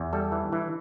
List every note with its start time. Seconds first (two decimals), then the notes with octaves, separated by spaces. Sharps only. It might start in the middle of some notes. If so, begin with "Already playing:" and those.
Already playing: E2
0.13 G3 A4
0.32 E3
0.53 E3